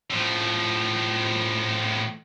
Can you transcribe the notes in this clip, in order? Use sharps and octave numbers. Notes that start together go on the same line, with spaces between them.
A2 F3